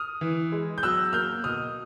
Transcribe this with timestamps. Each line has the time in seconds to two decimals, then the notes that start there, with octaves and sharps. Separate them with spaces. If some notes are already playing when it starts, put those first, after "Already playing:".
Already playing: D#6 F6
0.21 E3
0.52 G#3
0.78 G6
0.83 F#3 E6 F#6
1.13 A#3 F6 G6
1.44 B2 D#6 F6